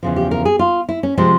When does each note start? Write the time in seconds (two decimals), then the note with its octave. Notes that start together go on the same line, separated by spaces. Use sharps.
0.03 E2 C#3 F3
0.16 G4
0.31 A#4
0.45 G#4
0.59 F4
0.89 E4
1.03 C#4
1.18 C3 F3 G#3 C4